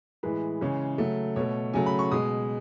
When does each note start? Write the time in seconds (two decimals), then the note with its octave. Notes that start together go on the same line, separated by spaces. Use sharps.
0.23 A2 E3 G#3 B4
0.61 C#3 E3 G#3 C#5
0.98 C#3 F#3 A3
1.36 B2 A3 C#5
1.74 C#3 F#3 A3 G#5
1.86 B5
1.99 C#6
2.12 B2 G#3 D#6